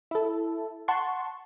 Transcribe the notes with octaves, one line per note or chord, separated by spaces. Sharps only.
E4 A4
F#5 A5 C6 C#6